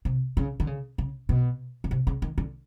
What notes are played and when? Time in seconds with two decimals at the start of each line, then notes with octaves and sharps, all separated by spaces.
0.05 C3
0.37 C#3
0.60 D3
0.67 C#3
0.98 C#3
1.29 B2
1.84 C#3
1.91 C3
2.07 C#3
2.22 D#3
2.38 D3